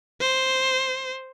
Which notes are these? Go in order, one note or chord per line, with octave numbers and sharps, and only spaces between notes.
C5